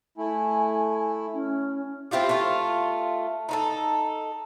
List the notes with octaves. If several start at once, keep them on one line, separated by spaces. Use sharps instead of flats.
A3 E4 G#5
C#4
C4 E4 F4 G4
A3 F4
D#4 E4 A4